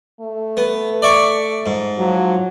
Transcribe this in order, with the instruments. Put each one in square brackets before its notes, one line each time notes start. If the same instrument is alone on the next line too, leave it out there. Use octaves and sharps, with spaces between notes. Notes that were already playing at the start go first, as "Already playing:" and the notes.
[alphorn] A3
[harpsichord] B3
D5 E5 C#6
G#2
[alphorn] F3 [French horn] F#3